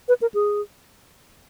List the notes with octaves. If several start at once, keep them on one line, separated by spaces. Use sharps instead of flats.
B4
A#4
G#4